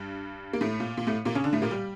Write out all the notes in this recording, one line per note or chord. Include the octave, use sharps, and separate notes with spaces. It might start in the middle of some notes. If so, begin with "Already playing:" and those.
Already playing: G2 G3
A#3
A2 A3
A#2
A#2
A2 A3
A#2 A#3
C#3 C#4
D3 D4
A2 A3
A#2 A#3
G3